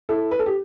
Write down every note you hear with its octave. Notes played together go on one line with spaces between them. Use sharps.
E4 A4
B4
A4
G4